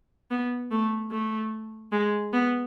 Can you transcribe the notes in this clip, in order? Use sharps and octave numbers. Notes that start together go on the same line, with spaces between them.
B3
A3
A3
G#3
B3